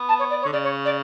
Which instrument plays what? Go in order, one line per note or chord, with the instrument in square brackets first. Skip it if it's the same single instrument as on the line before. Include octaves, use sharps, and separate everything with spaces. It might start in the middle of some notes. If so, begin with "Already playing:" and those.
Already playing: [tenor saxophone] B3
[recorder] A5
C#5
D5
C#5
[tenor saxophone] D3
[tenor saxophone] C#3 [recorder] D5
[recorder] C#5
D5